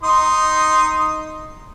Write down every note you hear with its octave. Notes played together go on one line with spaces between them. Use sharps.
D#4 C6 D#6